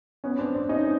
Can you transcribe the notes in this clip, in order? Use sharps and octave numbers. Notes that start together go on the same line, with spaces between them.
B3 C#4
C4 D4
C4 D4
C#4 D#4